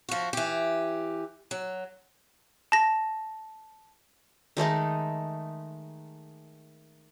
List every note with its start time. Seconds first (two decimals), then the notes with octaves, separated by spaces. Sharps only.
0.09 F3 F#4
0.33 E3 G4
1.51 F#3
2.72 A5 A#6
4.57 D#3 G#3 A3 D#4